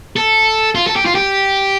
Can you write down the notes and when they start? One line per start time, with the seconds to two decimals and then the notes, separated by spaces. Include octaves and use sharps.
0.16 A4
0.75 F4
0.87 A4
0.96 G4
1.06 F4
1.15 G4